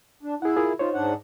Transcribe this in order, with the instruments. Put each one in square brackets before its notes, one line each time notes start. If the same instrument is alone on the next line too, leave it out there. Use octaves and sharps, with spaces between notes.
[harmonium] D4
[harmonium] E4 [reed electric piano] G#4 F#5
[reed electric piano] F4 G#4 A#4
[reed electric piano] D#4 C5 C#5 [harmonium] F4
[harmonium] G#2 D4 F#5